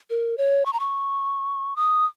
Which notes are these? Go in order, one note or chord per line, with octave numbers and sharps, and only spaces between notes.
A#4
C#5
C#6
A#5
C#6
D#6